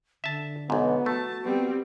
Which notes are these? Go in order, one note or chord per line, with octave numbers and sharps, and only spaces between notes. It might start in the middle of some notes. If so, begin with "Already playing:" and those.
D3 E5 A5
B1 G#2 B3
A3 F#4 A5
G3 B3 C4